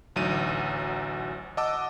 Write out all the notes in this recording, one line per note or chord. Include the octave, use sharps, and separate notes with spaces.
A1 D2 F#3 D#4 D#7
D#5 F#5 A5 D6 E6